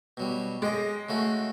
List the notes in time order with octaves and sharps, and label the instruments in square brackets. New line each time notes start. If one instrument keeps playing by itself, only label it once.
[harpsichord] B2 F#3 G3
[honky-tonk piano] G#3 [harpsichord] G4 D#5
[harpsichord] C#3 A3 F#4